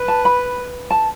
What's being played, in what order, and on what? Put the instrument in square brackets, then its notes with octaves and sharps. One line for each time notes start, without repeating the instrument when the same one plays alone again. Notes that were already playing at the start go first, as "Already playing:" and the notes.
Already playing: [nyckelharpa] B4
[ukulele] A5
B5
A5